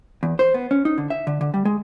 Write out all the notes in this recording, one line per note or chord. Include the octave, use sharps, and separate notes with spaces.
E2
C5
B3
C#4
D#4
D3
E5
D3
D3
G3
G#3